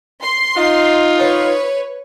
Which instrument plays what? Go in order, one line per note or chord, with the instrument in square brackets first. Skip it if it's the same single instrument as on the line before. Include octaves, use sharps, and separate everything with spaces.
[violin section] C6
[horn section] D#4 F4
[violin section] B4 C#5